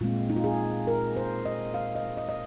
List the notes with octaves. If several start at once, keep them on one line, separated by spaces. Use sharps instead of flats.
A#2 G#3 C4 F4
D#4
F4
G#4
A#4
C5
D#5
F5
D#5
D#5
D#5